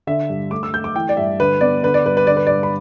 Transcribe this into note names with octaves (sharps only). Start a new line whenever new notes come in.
D3 E5
G2
A3 D6
E6
A3 G6
D6
E3 G5
D5
G2 E5
D3 B4
B3 D5
D3 B4
D5
G2 B4
B4
D3 D5
B4
G2 D5
B5